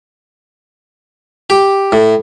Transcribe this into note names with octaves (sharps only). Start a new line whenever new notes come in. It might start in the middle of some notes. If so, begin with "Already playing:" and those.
G4
A2